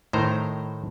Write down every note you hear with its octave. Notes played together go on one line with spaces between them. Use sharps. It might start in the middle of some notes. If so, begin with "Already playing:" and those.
A2 D#3 C5 A#5